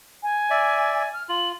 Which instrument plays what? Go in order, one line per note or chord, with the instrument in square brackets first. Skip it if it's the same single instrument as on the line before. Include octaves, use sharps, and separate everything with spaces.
[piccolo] G#5
[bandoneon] D5 E5
[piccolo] F6
[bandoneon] F4 [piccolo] F#7